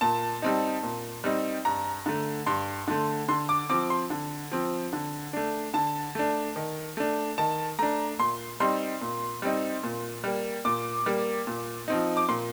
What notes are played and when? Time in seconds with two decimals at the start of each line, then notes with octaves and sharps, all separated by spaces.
0.01 A#2 A5
0.42 G3 C4 D#4
0.83 A#2
1.24 G3 C4 D#4
1.65 G2 A#5
2.06 D3 A3
2.46 G2 C6
2.88 D3 A3
3.28 D3 C6
3.49 D6
3.69 F3 C4 D6
3.90 C6
4.10 D3
4.52 F3 C4
4.93 D3
5.33 A3 D4
5.74 D3 A5
6.15 A3 D4
6.56 D#3
6.97 A3 D4
7.38 D#3 A5
7.79 A3 D4 A#5
8.19 A#2 C6
8.60 G3 C4 D#4 C6
9.01 A#2
9.42 G3 C4 D#4
9.83 A#2
10.24 G3 A#3
10.65 A#2 D6
11.06 G3 A#3
11.47 A#2
11.88 F3 C4 D#4
12.17 D6
12.29 A#2 C6